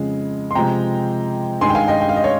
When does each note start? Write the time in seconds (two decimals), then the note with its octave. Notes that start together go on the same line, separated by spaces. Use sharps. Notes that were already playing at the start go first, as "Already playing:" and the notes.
Already playing: F2 C#3 G#3
0.51 C6
0.55 C3 F3 G#3 G5 A#5
1.61 G2 D#3 G#3 G#5 C6
1.69 G5
1.75 F5 G#5
1.88 D#5 G5
2.01 G5
2.09 F5
2.16 D#5
2.24 C#5 F5